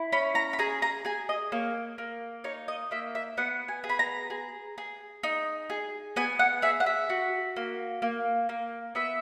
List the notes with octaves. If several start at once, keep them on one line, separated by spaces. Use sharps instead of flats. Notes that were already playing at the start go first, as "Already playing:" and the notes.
Already playing: E4
C#4 B5
A#5
B5
G#4 A#5
A#5
G#4 G#5
D#5
A#3 C#5
A#3
D#4 C#5
D#5
A#3 E5
E5
B3 F#5
G#5
G#4
B5
A#5
G#4
G#4
D#4
G#4
B3 G#5
F#5
G#4 E5
F#5
E5
F#4
A#3
A#3
A#3
B3 E5